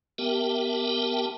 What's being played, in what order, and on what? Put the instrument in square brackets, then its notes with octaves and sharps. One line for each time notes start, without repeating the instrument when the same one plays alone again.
[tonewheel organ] B3 G4 A#4 E5 G5 A5